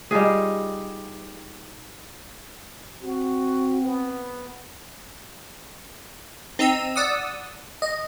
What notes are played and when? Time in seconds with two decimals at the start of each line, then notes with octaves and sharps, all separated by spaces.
0.11 G3 D#4 F4 G#4
3.02 C4 F#4
3.82 B3
6.59 C4 D#4 A#5 E6 D#7
6.96 D5 F#5 D#6 E6
7.82 D#5